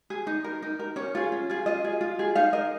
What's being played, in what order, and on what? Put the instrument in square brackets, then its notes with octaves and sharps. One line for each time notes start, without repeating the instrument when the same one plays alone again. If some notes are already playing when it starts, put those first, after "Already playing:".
[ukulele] G#4
D#4
A#4
D#4
A#4
C#4 C#5
F4 G#4
C#4
F4 G#4
F4 D#5
G#4
F4
G#4
D#4 F5
A#4 D#5